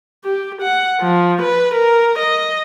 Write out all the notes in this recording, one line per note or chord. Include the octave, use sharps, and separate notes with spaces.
G4
F#5
F3
B4
A#4
D#5